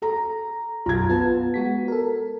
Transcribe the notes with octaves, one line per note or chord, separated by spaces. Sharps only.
A4 A#5
B1 F#2 F4 A#5 G#6
B3 F4 B4 A5
G#3 F#4 B6
A4 A#4